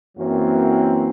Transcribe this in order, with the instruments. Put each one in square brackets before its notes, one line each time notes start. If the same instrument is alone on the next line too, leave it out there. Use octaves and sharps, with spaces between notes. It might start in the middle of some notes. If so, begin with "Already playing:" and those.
[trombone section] F#2 E3 F#3 A#3 C4